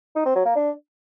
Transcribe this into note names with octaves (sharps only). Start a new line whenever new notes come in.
D#4
C4
F#3
A#3
D4